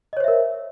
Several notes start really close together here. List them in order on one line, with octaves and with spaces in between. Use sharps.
D#5 C#5 C5 E5 A#4